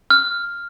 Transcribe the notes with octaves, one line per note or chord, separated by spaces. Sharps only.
F6